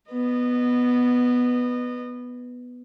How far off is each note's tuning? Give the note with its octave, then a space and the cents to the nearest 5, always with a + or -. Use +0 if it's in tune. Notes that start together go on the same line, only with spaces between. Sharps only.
B3 +0 D#5 -25